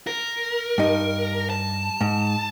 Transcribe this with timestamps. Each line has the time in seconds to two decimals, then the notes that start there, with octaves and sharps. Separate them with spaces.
0.07 A#4
0.78 G2 D#4
1.50 A5
2.01 G#2